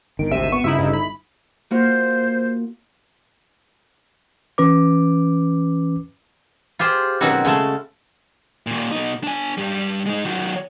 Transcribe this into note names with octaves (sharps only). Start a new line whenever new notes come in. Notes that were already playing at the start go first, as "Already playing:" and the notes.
G1 D#3 D7
G#1 D2 C3 E5 D#7 E7
B3 C#6
G1 C#3 D#4 E4 E5
G2
B5
A#3 F4 F#4 C5
E3 C#4 B4 D6
F4 G4 G#4 C5
B2 D#3 F#3 C4 C#4 F#4
C#3 G#3 A3 A5
D#2 A#2
B2 D#4
D4 G#5
G2 G3
G#3 D#4
D#3 F#3